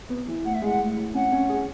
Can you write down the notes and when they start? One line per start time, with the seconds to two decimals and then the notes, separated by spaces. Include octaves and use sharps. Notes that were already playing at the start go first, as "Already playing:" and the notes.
0.09 B3
0.27 E3
0.45 A2 F#5
0.54 E5
0.62 G#3 F#5
0.79 A2
0.97 A2
1.14 C#4 F#5
1.32 C#4
1.49 G#4